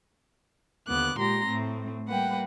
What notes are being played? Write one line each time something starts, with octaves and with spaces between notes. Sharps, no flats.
D#2 D3 B3 D6 F#6
A#2 G#3 G4 A#5 C6 A#6
A2 A3 C4
G3 A#3 B4 F#5 G5